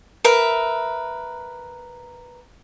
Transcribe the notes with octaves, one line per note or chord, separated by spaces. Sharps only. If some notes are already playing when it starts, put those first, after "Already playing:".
A#4 B4 E5